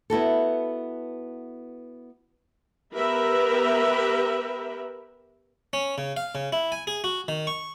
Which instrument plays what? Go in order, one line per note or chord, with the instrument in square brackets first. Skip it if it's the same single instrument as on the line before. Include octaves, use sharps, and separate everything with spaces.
[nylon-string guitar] B3 E4 F#4 A4
[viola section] B3 G4 A#4 B4 E5 B5
[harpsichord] C#4
C#3
F5
C#3
E4
G#5
G#4
F#4
D#3
C#6